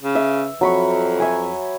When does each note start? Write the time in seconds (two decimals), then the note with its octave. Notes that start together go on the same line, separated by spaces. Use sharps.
0.03 C#3
0.15 E5
0.61 F2 F#3 B5 C#6
1.20 E5 G#5